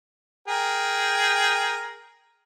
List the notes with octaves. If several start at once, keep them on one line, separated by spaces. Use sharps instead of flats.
G#4 A#4 G5